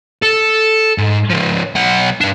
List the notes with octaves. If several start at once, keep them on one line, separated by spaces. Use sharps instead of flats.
A4
G#2
C#3 F3
B1 F#5
G2 D4